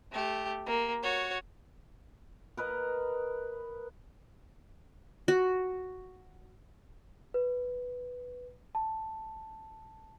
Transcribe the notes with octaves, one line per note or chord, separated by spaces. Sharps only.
A3 G4
A#3
F#4 C#5
A#4 B4 D#5
F#4
B4
A5